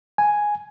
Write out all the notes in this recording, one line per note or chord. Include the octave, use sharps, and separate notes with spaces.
G#5